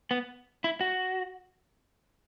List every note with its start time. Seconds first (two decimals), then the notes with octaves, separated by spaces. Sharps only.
0.11 B3
0.64 E4
0.81 F#4